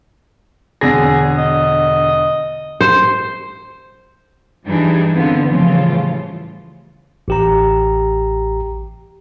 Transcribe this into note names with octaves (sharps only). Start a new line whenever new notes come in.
E1 D3 G#4 A#6
D#5
C5
G2 E3 G3 D4 D#4 G#4
D3 B3 C4 F4
A2 C#3 E3 F3 G3 F4
A1 G4 A#5